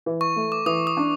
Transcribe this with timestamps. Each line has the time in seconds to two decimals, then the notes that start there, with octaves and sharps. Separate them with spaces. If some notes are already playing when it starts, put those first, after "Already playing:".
0.06 E3
0.21 C#6
0.36 A3
0.52 D6
0.66 E3 D#6
0.87 D#6
0.97 D4